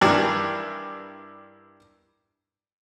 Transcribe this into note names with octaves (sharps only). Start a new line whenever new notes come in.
G2 D#3 E3 D4